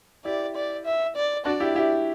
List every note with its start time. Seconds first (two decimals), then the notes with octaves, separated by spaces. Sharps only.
0.25 E4 G4 D5
0.55 D5
0.85 E5
1.16 D5
1.45 D4 F#4 D5
1.60 E4 G4
1.75 E4 G4